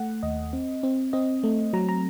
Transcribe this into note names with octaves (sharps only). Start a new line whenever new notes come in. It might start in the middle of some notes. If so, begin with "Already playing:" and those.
Already playing: A3 F#5
D#2 D#5
C4
C4
C4 D#5
A3
F#3 A#5
A#5